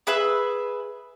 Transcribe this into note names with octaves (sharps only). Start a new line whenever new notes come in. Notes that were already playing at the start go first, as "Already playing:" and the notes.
G#4 B4 E5 E6